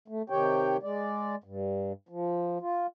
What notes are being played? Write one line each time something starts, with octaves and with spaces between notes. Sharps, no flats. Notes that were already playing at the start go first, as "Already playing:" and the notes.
A3
C3 D#3 G4 C#5 G5
G#3 D5
G2
F3
F4